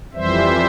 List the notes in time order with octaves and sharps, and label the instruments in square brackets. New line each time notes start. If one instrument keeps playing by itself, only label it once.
[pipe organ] F2 E3 G3 C5 E5